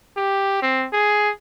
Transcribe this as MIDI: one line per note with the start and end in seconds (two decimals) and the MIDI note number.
0.17 0.62 67
0.62 0.86 60
0.93 1.30 68